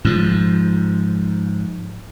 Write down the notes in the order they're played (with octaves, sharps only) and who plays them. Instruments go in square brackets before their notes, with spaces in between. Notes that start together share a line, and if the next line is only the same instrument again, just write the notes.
[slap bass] G#2 F3